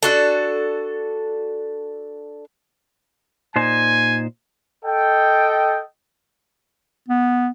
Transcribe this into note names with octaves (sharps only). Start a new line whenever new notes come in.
D4 F#4 A4
A#2 D#4 C5 G#5
A4 D#5 G5
B3